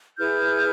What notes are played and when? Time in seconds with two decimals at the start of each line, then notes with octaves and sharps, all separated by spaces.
0.18 E4 G#4 B4 F6 G6